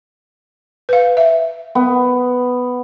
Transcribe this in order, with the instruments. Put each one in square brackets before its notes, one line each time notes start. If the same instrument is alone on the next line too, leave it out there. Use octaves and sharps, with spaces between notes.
[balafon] B4 F5
E5
[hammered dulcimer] B3